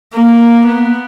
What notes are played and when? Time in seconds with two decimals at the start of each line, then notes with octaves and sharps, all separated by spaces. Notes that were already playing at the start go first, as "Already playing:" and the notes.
0.13 A#3
0.65 B3